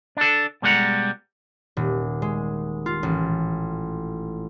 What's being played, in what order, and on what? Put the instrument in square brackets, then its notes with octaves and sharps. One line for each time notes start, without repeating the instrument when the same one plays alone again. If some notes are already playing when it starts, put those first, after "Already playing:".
[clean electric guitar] D4 A4
B2 G3 G#3 F#5 A#5
[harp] D#1
G#3
F4
A1